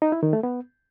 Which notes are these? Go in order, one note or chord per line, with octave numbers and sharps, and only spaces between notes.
D#4
E4
D#3
A3
B3